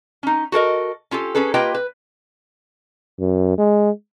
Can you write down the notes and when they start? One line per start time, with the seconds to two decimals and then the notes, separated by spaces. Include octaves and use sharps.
0.23 C#4 D#4
0.52 F#4 A4 A#4 D#5
1.11 C#4 F4 G4 A4
1.35 C#4 G#4 A4 B4
1.54 A#3 F4 G4 B4 D#5 G5
1.74 B4
3.19 F#2
3.58 G#3